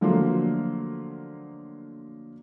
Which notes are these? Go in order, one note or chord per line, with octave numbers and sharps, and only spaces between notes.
D3 F3 F#3 A3 A#3 F4